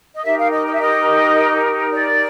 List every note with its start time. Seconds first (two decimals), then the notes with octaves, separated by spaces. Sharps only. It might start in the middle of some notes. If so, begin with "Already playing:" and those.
0.13 D#5
0.23 D#4 G4 A#4 E5
0.37 F5
0.51 D#5
0.65 D#5
0.72 E5
0.79 D#5
1.91 D5